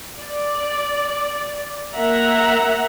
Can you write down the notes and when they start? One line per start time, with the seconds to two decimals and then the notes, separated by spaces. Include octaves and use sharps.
0.20 D5
1.97 A#3 E5 F#5 A#5